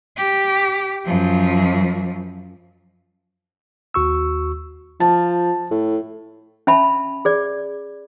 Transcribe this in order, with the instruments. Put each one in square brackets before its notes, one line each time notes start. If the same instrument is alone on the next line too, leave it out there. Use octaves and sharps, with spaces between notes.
[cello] G4
F#2 F3
[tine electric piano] D#2 F#4 C#6 E6
[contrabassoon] F3 [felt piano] A5
[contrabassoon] A2
[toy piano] C#4 E5 A5 B5
G#4 D5